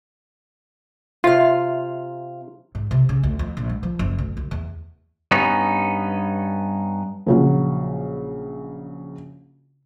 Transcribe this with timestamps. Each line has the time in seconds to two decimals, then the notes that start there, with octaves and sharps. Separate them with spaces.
1.24 C3 F4 F5
2.75 G#2
2.91 C3
3.09 C#3
3.23 D2
3.39 F2
3.57 A#1
3.69 G#3
3.83 F3
3.99 F#1
4.18 D2
4.37 D2
4.51 E2
5.31 G2 B3 C#4 D#4
7.26 A#1 C#3 F#3